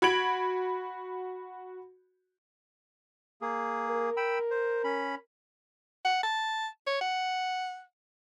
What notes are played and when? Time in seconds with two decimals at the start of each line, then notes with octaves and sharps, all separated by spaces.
0.02 F#4 B5 G#6 D7 F#7
3.41 A#3 G#4
3.88 A#4
4.17 G5 B5 E6
4.50 C5
4.84 C#4 B5
6.05 F#5
6.23 A5
6.87 C#5
7.01 F#5